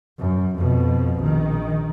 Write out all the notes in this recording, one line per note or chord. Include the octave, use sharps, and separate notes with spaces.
F#2
F2 B2
A#1 D#3